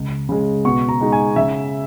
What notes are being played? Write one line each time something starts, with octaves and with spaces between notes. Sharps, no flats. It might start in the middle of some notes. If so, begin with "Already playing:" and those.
Already playing: C#2
C#3 G#3
B2 C#6
A#5
G#3 D#4
G#5
C#3 E5